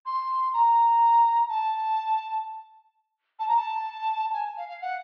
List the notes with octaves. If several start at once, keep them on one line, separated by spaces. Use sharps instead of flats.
C6
A#5
A5
A5
A#5
A5
G#5
F5
F5
F#5